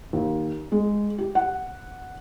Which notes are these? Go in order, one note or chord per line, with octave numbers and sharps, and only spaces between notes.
D#2
G#3
G4
F#5